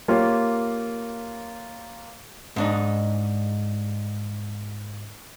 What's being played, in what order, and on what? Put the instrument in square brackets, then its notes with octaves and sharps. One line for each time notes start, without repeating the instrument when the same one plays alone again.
[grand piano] A#3 F4 G4 C#5
[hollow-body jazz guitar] G#2 D4 D#4